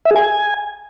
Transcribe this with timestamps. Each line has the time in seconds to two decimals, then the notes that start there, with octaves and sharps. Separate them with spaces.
0.05 E5
0.11 G#4
0.16 G#5